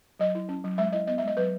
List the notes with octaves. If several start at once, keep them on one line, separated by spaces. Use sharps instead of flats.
F#3 D#5
E4
C#4
F#3
G#3 E5
E4 D#5
B3 D#5
E5
G#3 D#5
F#3 B4